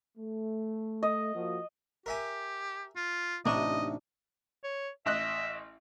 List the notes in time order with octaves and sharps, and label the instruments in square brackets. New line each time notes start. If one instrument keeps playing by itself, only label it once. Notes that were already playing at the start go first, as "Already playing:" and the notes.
[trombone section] A3
[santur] D#5
[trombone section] F3 A#3 F#4
[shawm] G4 [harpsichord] A#4 E5 G#5
[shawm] F4
[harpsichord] A1 C3 C#6 [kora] D4 D#4 [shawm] D#5
[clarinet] C#5
[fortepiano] A1 D#5 F#6 [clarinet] E5